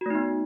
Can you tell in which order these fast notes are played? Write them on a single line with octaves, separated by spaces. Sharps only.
F#4 A3 D#4 B3